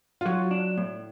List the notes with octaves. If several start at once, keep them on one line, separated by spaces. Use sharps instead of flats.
F4
F#3 F#4
D4
A2